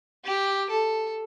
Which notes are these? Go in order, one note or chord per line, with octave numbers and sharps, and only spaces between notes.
G4
A4